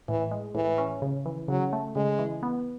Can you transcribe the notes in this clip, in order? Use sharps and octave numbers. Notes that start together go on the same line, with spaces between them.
A2 E3
G#3
A2 E3
C#4
C#3
E3
C#3 F#3
A3
C#3 G#3
E3
B3